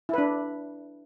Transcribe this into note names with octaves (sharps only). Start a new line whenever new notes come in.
D4 E4 B4